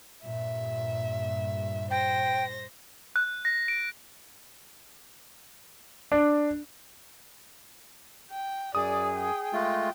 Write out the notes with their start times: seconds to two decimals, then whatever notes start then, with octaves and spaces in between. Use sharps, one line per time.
0.23 G2 A#2 E5
1.91 C5 G5 A#6
3.16 F#6
3.45 A#6
3.68 D7
6.12 D4
8.31 G5
8.75 F#2 G#4 D5 D#6
9.16 G5
9.53 G#3 A3 F4